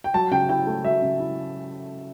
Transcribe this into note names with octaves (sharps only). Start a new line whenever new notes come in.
G5
F#3 A5
C#3 G5
E4 G5
A3
F#3 E5
C#3
E4